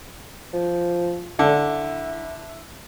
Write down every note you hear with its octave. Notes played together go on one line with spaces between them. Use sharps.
F3
D3 E4